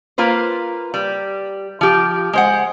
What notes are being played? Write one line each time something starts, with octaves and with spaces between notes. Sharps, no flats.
A#3 F4 B4 C5
G3
F3 G4
G#3 C5 F#5